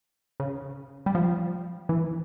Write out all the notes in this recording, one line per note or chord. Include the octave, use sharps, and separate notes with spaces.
C#3
G3
F3
E3